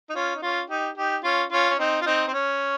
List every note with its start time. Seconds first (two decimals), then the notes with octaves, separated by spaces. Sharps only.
0.10 D#4
0.15 C#4 F4
0.36 D#4
0.42 C#4 F4
0.70 D#4 G4
0.97 D#4 G4
1.24 C#4 F4
1.52 C#4 F4
1.69 C#4
1.78 C4 D#4
2.01 F4
2.06 C4 D#4
2.28 C4
2.33 C#4